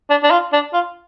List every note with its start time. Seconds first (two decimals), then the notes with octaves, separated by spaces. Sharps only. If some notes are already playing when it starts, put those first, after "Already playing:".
0.10 D4
0.23 D4
0.31 F4
0.53 D4
0.73 F4